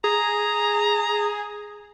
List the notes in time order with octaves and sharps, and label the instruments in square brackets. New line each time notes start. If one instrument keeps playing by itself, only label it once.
[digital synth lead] G#4 [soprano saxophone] A#5